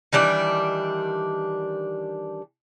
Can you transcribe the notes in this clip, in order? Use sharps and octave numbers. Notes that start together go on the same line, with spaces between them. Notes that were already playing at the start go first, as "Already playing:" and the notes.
D#3 E3 G3 D4